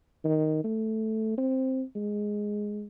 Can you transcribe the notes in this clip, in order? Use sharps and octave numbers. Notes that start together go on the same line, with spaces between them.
D#3
A3
C4
G#3